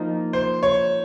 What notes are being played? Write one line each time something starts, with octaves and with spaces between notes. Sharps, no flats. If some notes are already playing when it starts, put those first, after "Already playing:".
Already playing: F3 A#3 D#4 A#4
C5
C#5